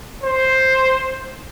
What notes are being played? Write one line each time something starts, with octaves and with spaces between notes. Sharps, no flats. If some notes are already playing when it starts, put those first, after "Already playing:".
C5